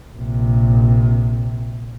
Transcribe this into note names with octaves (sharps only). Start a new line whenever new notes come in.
A#1 C3